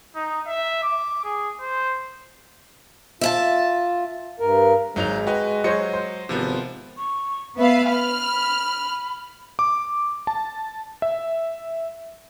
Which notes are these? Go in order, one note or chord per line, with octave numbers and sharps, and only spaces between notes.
D#4
E5
D6
G#4
C5
F4 E5 F5 A5
G2 A#4
G#1 F#3 G#3 D#4 F7
F#4 B4 D#5 G5
F#3 F#4 C5 C#5 D#5 C#7
C5
G#1 C3 F3 B3
C#6
B3 B4 E5 F5
B5 F6
D6
A5
E5